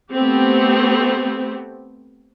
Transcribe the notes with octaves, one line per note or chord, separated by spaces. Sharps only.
A3 B3 C4 G4